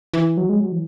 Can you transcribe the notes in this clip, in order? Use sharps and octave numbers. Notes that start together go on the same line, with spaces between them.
E3
F#3
G#3
F#3
E3